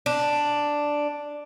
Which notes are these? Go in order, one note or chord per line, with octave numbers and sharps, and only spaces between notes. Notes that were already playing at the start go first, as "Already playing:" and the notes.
D4